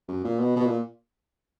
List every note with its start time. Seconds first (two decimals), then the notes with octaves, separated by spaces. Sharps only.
0.08 F#2
0.24 A#2
0.40 B2
0.56 B2
0.66 A#2